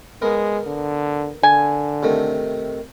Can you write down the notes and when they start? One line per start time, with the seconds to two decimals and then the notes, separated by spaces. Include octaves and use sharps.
0.22 G#3 B3 A#4
0.67 D3
1.43 D3 G#5
2.03 C3 D#3 A3